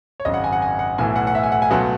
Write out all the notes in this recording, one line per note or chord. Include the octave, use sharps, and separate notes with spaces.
C#5
G#1 F#2 C#3 D#5
F#5
G#5
F#5
G#5
F#5
B1 A2 E3 G#5
F#5
F#5
E5
G#5
F#5
G#5
C#2 B2 F#3 A3 C#4 F#5